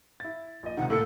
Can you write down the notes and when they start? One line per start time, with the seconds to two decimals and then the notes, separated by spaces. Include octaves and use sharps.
0.20 E4 A6
0.63 A#1 D#5
0.77 C#2 C3 D#3 F#5
0.90 A2 A#3 A4 C#7